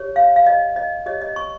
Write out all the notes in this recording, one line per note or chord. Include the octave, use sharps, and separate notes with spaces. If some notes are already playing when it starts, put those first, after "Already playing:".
Already playing: G4 C#5
F5
F5
D#5
D#5
G4 C#5 D#5
D#5
C#6